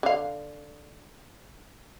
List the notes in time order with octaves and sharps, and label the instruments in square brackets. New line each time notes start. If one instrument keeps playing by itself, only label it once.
[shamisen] D3 F5